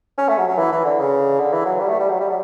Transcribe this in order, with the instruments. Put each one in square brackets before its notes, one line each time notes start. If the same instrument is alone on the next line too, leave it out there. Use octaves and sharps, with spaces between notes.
[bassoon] C#4
A3
F#3
F#3
E3
E3
D3
C#3
D3
E3
F#3
G3
A3
G3
F#3
G3
F#3